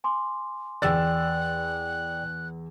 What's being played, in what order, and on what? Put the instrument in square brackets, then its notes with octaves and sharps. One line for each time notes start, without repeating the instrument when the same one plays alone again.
[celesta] G#5 C6 D6
[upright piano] E2 E6 A6 [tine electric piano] D5 G5 [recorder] F#6